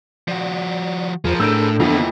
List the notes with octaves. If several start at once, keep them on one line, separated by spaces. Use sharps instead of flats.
F3 F#4 D5
E2 F3 F4 G#4 A#4 C5
A2 D4 A4 E6 G6 D7
F2 D3 E3 A#3 B3 E4